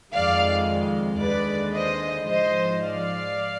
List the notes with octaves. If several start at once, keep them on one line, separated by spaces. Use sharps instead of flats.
F2 D#3 G#3 D5 F5
D#2 D3 G#3 B4 D5
C5 D#5
G#2 F3 G#3 C5 D#5
D5 F5